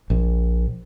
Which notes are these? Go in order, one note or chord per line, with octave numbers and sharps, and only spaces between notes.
A#1